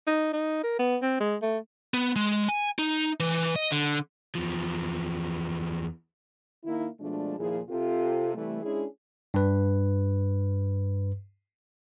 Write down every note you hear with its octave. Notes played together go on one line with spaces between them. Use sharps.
D#4
D#4
A#4
B3
C4
G#3
A3
B3
G#3
G#5
D#4
E3
D#5
D3
E2 F3
D#3 A#3 D#4 E4
B2 F3 G#3 A3 D4
D#2 A#2 F3 E4 G#4
C3 F4 A4
C3 E3 G3 A3
G#3 C#4 D4 E4 G#4
G2 B4